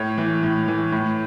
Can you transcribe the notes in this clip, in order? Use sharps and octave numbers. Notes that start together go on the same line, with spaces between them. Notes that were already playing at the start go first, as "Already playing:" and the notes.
Already playing: A2 C#5
E3
A2
E3
A2